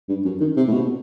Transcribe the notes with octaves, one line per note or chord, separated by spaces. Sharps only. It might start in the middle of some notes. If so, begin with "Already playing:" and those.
G2
F#2
D#3
C3
A2
B2